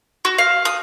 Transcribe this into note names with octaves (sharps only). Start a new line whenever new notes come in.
F#4
F5
D#6